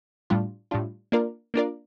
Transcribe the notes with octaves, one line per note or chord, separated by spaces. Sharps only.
A2 G3 D4 F4
A2 G3 D4 F4
A#3 D4 F4 A#4 D5
A#3 D4 F4 A#4 D5